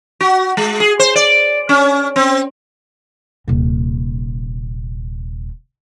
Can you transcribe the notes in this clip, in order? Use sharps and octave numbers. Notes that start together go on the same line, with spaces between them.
F#4
G#3
G#4
C5
D5
C#4
C4
D#1 C3